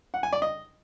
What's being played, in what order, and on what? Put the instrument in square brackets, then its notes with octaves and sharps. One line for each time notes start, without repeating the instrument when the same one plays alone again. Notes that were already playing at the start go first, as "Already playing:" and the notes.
[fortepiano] F#5
G#5
D5
D#5